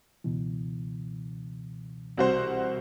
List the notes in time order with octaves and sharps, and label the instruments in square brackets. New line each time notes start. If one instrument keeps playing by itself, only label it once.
[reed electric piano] C#2 B2 E3
[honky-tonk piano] C2 F#4 C5